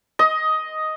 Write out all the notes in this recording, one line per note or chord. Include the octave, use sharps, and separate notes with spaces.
D#5